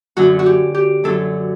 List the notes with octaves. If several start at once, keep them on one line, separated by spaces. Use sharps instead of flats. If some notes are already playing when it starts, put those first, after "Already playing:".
F#2 D3 F#3 F#4
F#4
G4
G4
F#2 D3 F#3 A4